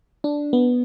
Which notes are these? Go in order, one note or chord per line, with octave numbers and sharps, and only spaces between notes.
D4
B3